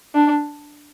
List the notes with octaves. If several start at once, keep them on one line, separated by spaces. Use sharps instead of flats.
D4